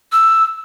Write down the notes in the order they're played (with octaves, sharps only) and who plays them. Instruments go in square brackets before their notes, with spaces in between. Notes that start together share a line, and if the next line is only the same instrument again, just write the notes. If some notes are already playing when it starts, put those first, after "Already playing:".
[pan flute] E6